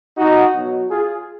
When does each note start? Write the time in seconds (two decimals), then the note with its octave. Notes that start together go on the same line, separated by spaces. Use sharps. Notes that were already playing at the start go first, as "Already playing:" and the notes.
0.17 D#4 F#4
0.54 B2 F#3
0.90 F4 G#4